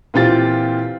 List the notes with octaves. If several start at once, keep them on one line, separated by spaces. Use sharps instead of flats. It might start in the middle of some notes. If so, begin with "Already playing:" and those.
A#2 E3 C4 F4 G4 A6